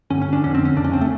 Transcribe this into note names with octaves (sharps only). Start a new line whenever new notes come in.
G2 D3 C#4
C#4
D4
F2 D3 C#4
C4
C#4
F2 C#3 D4
C#4
C4
A3